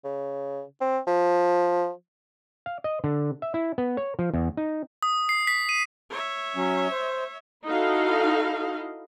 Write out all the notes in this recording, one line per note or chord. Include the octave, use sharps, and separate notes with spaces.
C#3
C4
F3
F5
D#5
D3
E5
E4
B3
C#5
F3
E2
D#4
D#6
C7
B6
D#7
C#5 E5
F#3 C#4
C5
D#4 E4 F#4 A4 D#5 F5